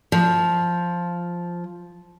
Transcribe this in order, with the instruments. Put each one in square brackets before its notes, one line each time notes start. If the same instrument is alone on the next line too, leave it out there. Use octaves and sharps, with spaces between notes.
[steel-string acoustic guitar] F3